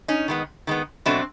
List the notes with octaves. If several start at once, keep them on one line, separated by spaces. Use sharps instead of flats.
C#4 D#4
D#3 G#3 B3
D#3 G#3 B3
B2 F#3 A3 C4 D4